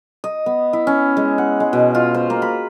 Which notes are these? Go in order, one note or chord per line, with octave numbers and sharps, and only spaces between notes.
D#5
B3
E4
C#4
G#3
F#5
G#3
B2
F4
C5
A#3
B5